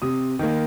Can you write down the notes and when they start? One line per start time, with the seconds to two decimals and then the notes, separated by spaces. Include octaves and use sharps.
0.02 C3 D#6
0.39 D#3 A#3